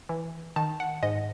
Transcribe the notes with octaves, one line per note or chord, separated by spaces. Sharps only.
E3
D#3 A5
F#5
G#2 D#5